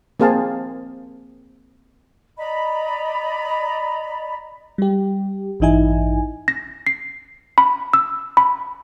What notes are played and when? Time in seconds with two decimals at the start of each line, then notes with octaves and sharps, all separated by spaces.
0.20 A#3 C4 G#4 F5 A5
2.38 D5 D#5 A#5 B5
4.78 G3 G4
5.60 A1 G2 E3 D#4 E4 G#5
6.48 A#6
6.87 C7
7.58 B5
7.93 E6
8.37 B5